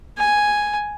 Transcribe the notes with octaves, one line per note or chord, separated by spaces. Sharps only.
G#5